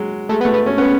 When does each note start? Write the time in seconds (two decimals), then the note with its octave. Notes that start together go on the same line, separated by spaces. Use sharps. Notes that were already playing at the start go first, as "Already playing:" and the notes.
Already playing: F#3 G#3
0.29 G#3 A3
0.41 B3
0.45 A3
0.53 B3
0.66 C#4
0.78 B3 C#4